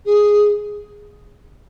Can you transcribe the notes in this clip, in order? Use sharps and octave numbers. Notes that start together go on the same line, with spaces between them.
G#4